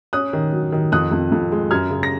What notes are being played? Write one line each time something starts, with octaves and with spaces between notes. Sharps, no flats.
C#4 D#6 F#6
D#3
F#3
D#3
F2 D#6 F#6
F2
F2
G#3
F#2 F6 G#6
C#3
A#6